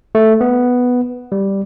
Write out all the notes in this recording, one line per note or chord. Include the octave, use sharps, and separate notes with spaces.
A3
B3
G3